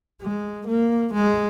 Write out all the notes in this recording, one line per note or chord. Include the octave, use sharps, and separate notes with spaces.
G#3
A#3
G#3